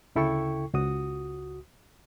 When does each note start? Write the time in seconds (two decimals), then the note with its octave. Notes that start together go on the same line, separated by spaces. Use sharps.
0.15 D2 C#3 E4 A4 G5 C#6
0.74 C#2 F#4 D#6